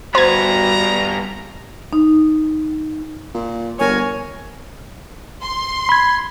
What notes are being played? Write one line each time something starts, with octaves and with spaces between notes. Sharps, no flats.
G2 B3 F#4 C5 A#5 G#6
D#4
A#2
G1 A#4 C#5 G#5
C6
B5 G#6